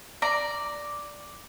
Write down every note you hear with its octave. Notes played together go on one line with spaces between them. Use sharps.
D5 A#5